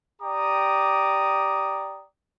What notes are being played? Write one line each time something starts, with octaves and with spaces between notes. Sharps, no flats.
G4 D5 G5 A#5 D6 D#6